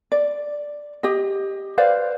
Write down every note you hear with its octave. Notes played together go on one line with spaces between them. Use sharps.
D5
G4 D#5
B4 C5 D5 F5